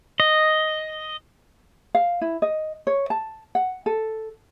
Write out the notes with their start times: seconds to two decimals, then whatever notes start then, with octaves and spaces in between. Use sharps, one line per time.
0.20 D#5
1.95 F5
2.21 E4
2.42 D#5
2.87 C#5
3.10 A5
3.55 F#5
3.86 A4